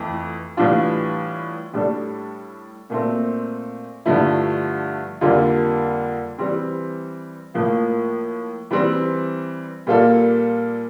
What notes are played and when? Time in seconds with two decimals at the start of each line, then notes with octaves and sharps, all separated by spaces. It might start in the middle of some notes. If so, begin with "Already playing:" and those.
Already playing: F2 E3 A3
0.57 A2 E3 G3 D4 F4
1.74 A2 G3 D4 A4
2.90 A#2 A3 C4
4.06 G2 D3 F3 A3 E4
5.21 F2 D3 G3 A#3 F4
6.38 E3 G3 C4
7.54 A2 F3 A#3
8.71 E3 G3 C4
9.87 A#2 G3 A#3 F4 A4